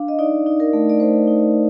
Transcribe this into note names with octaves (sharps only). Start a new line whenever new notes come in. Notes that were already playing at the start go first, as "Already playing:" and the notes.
Already playing: D4 F5
D#5
D#4 D5
D#4
A#4
A3
D5
A3 C5
D#4